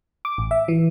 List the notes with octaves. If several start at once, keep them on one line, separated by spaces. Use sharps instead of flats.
D6
A1
E5
E3